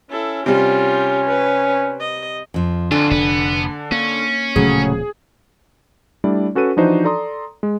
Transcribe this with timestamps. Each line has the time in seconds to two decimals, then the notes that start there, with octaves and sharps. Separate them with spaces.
0.10 C#4 E4 A4
0.46 C3 G3 C#4 F4 G4
1.28 B4
2.00 D#5
2.54 F2 F3
2.91 F2 D3 D4 F4 G#5
3.11 F1 B3
3.92 A#3 C#4
4.56 D1 A#2 C#3 F3 F#3 A3 G#4
6.24 G3 A3 D4 E4 D5
6.55 C#4 F#4 A4 B4 D#7
6.76 E3 F3 D4 D#4 F#4 C5
7.04 A4 D5 A#5 C6 D#6
7.63 G#3